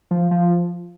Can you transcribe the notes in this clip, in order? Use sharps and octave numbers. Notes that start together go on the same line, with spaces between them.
F3
F3